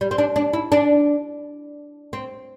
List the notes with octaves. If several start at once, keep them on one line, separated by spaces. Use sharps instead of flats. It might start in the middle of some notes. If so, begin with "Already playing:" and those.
G3
C4
D4
D4
E4
D4
C4